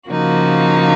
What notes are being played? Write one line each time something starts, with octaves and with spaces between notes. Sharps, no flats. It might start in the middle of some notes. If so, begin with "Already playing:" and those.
C#3 F3 A#3 D#4 F#4